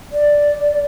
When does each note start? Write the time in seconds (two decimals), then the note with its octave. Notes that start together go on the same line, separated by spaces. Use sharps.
0.12 D5